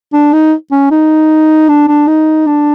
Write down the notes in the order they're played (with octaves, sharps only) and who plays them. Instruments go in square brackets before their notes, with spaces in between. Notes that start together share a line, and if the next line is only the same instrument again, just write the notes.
[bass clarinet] D4
D#4
C#4
D#4
D4
D4
D#4
D4